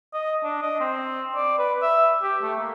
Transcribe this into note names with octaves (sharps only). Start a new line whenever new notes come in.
D#5
D4
D#5
C4
D5
B4
E5
G4
A3
A#3